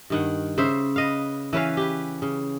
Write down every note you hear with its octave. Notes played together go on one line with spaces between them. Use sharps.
G2 D#3 F#5
C#3 C5 E5
B4 D#5 F5
E3 C#4 B4 F5
G4 B4
C#3